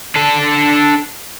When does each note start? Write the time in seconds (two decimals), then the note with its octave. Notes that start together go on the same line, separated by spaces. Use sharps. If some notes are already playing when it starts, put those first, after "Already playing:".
0.15 D4 A4